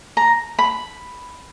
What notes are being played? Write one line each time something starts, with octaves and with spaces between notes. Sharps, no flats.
A#5
B5